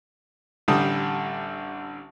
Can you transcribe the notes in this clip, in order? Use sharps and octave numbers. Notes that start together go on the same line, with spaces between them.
A1 D3 G3 D#6